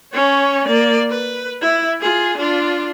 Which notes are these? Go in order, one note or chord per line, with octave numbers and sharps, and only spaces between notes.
C#4 C#5
A#3 D5
B4
E4
F4 G#4
D4 F4